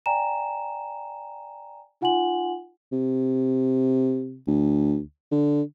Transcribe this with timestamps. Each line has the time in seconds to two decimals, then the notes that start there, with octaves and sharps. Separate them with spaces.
0.06 D5 G5 G#5 A#5 E7
2.01 D#4 F4 F#5 G#5 C6 F#7
2.92 C3
4.47 D2
5.32 D3